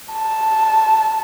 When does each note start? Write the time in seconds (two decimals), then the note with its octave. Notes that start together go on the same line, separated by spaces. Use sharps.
0.13 A5